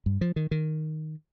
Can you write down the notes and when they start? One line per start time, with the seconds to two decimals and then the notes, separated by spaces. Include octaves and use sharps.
0.06 G2
0.21 F3
0.36 D#3
0.51 D#3